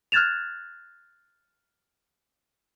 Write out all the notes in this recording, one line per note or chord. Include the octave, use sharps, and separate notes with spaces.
F6 F#6 G#6 A6 E7 F7